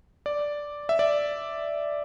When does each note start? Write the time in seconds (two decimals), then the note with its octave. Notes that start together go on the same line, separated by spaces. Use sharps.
0.26 D5
0.89 E5
0.99 D5